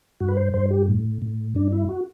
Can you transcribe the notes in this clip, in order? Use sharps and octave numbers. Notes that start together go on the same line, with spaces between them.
G2 F#4
B4
C5
G2 C5
G4
A2
A2
G2 D4
E4
F#4